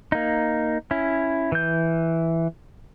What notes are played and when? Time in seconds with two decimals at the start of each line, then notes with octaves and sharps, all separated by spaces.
0.12 A#3 D#4
0.91 C#4 E4
1.52 E3 G6